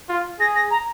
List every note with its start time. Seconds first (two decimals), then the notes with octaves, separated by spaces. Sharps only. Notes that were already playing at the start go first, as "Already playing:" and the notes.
0.09 F4
0.40 G#4 A#6
0.56 A#6
0.71 A#5